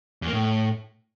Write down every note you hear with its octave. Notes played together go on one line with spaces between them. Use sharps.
E2
A#3
A2